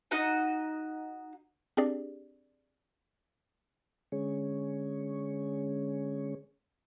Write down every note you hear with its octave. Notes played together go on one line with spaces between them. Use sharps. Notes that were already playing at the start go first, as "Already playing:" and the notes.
D#4 F#4 D#5
C4 D4 G4 G#4 D5
D3 G#3 C#4 G#4 C#5